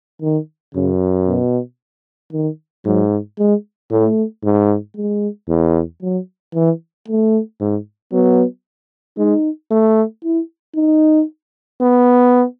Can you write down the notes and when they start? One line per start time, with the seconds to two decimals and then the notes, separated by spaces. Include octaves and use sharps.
0.22 D#3
0.75 F#2 C#3
1.28 B2
2.33 D#3
2.86 G#2 F#3
3.38 G#3
3.91 A2 A3
4.44 G#2
4.97 G#3
5.49 E2
6.02 F#3
6.55 E3
7.08 A3
7.61 G#2
8.12 F#3 B3
9.18 G#3 D#4
9.71 A3
10.24 E4
10.76 D#4
11.81 B3